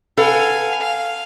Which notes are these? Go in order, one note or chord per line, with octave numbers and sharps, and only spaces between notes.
A4 B4 F5 F#5 G#5
F5